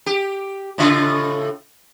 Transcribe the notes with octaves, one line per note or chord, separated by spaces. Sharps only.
G4
A2 C#3 F4